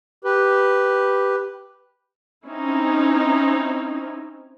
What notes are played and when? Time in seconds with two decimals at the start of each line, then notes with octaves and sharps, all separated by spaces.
0.24 G4 B4
2.46 C4 C#4 D#4 E4